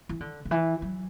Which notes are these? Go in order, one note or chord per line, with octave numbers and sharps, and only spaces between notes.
E3
D3
D3
E3
F#3